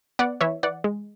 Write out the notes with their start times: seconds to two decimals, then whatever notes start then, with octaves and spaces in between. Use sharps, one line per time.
0.19 B3 D5 F#5
0.41 E3 C#5 E5
0.63 E3 D5 F#5
0.84 G#3